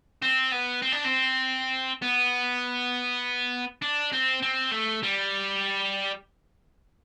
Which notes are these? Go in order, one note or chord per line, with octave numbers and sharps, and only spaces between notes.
C4
B3
C4
D4
C4
B3
D4
C4
C4
A3
G3